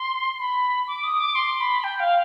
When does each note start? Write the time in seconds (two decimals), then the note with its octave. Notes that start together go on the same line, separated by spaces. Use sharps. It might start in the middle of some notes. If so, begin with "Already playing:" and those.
Already playing: C6
0.39 B5
0.88 D6
1.04 D#6
1.20 D6
1.35 C6
1.60 B5
1.84 G5
2.00 F5